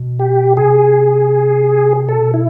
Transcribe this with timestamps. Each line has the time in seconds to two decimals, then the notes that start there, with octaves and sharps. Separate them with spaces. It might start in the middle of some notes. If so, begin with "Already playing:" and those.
Already playing: B2
0.19 G4
0.57 C3 G#4
2.08 B2 A4
2.34 E4